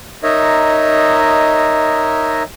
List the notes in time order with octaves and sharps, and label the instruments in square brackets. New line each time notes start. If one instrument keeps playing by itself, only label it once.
[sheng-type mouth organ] D#4 A#4 C#5 D#5 E5